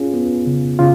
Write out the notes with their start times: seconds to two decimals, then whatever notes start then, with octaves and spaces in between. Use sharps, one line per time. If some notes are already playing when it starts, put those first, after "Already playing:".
Already playing: C#4 F4 G#4
0.14 B3
0.47 C#3
0.79 C#3 F4